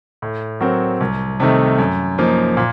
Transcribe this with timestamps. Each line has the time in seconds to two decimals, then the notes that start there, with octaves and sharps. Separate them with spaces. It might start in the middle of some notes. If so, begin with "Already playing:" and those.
0.22 A2
0.61 F#3 C4 F#4 A#4
1.00 C2
1.40 C3 D#3 A3 D#4
1.78 F#2
2.18 F3 A#3 D#4
2.57 A#2